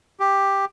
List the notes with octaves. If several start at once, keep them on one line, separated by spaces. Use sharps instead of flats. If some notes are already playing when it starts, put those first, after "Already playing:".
G4